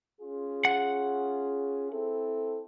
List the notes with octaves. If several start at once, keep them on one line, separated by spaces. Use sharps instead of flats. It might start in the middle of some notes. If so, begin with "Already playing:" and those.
C#4 F4 G#4
F#5
C4 E4 A4